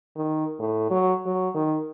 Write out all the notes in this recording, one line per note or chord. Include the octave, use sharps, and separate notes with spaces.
D#3
A2
F#3
F#3
D#3